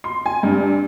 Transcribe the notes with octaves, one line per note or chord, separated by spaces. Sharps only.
C6
G#5
G2